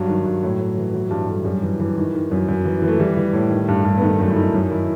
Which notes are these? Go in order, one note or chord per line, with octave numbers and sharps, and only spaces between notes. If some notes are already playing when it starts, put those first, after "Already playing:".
Already playing: G2 F#3
D#3
G2
A2
A2
E3
E3 F#3
G2 G3
G2 A3
F#2 G3
E3
E3
D#3
D#3
F#2
F#2
E3
E3
A3
E3 G3
E3
A2
D#3
G2
G2
B3
D#3 A3
F#2 A3
E4
D#3 D#4
F#2
D#3 E4